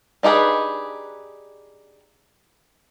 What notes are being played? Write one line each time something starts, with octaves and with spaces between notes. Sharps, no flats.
D4 D#4 G4 G#4 B4